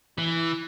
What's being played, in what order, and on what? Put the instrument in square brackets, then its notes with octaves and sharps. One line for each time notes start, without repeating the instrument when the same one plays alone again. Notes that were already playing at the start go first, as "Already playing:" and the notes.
[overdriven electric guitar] E3